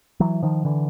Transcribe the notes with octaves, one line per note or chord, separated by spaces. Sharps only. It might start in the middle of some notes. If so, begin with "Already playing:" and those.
E3 F#3
D#3 F3
D3 E3